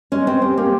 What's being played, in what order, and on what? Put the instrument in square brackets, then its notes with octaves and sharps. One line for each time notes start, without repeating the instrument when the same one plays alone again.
[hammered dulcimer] G#3 [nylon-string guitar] C#4
[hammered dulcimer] G#3 [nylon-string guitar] C4
[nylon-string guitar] C4 [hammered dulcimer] G4
[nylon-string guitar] A#3 [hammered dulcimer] G4